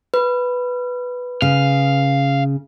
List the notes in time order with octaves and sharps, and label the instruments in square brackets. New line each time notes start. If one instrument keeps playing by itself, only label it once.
[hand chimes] B4
[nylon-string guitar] C#3 [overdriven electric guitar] F5